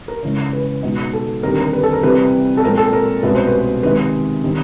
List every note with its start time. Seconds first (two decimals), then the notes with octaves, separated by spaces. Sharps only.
0.08 A#4
0.23 C#3 E3 G#3 C#4
0.53 B4
0.83 B2 G#3 B3 D#4
1.13 A4
1.43 D#2 D3 G3 C4 D#4 A#4
1.58 A#4
1.73 B4
1.83 A4
1.93 A#4
2.03 C3 E3 G3 C4 B4
2.57 A4
2.63 A#2 F3 G#3 C4 A#4
2.78 A4
2.93 A#4
3.23 C2 B2 G#3 C#4 B4
3.35 C5
3.47 B4
3.83 C3 D#3 G#3 B4
4.44 D#3 G3 C4